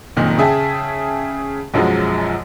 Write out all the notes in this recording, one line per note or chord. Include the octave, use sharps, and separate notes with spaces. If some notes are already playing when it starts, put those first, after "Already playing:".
F#1 F2 A#2 D#3
C#3 G#4 E5 G5 A5
B1 F#2 F3 F#3 G#3